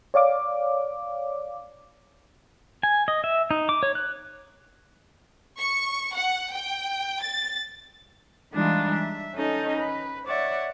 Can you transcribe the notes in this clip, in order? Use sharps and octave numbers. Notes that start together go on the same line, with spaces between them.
C#5 D5 F5 D6
G#5
D#5
E5
D#4
D6
C#5
F#6
C#6
F#5
G5
A6
E3 G3 G#3 D4 D#4 F4
E5
C#4 D#4 A4 D#5
B4
C#5 D5 E5 F#5